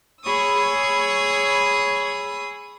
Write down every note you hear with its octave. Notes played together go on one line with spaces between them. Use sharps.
G#4 C#5 B5 C#6 D#6 E6